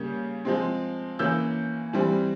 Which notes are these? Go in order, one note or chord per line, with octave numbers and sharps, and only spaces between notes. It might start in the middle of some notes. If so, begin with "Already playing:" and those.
Already playing: C#3 G3 A#3 C#4 G6
F3 G#3 C4
E3 A#3 C#4 E6 G6
E3 G3 C4